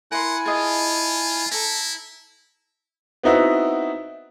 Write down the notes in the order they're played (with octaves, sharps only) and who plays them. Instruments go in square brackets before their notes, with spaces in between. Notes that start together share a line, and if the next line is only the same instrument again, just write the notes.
[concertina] E4 G#5 [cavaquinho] A#4 C6 [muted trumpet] F#5
[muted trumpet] F4 [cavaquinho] G#4 D#5 A5
[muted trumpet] E4 [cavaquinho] A4 A#5
[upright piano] B3 C4 D#4 E4 F#4